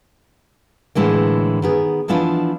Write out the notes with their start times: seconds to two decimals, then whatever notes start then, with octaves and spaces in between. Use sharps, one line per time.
0.95 A2 D3 E3 G#3 A#3
1.62 D#3 B3 G#4
2.08 E3 F3 B3 D4 E4 F4